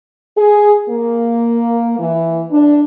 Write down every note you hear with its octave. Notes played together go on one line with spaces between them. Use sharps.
G#4
A#3
E3
D4